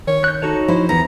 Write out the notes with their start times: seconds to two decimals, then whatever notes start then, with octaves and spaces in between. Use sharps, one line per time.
0.07 D#3 C#5
0.24 F#6 G6
0.42 D#4 F#4 A4 C#5
0.68 F3 E4 C5
0.89 E2 A#5